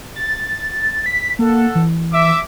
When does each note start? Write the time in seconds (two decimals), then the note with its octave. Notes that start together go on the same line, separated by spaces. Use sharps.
0.16 A6
1.06 B6
1.39 A#3 A4 F#5
1.75 E3
2.13 E5 D6